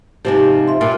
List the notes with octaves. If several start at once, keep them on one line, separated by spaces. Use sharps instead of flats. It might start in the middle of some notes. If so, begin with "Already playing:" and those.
G#2 C3 F3 G4
E5 C6
G2 A#2 F4